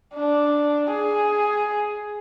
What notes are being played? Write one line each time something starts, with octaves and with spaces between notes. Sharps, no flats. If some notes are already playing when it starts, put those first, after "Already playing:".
D4
G#4